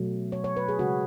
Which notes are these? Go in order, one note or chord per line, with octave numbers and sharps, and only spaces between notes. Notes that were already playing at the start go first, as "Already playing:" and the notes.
Already playing: B2 F#3 A3
C#5
C#5
B4
G#4
C#3 G#3 F#4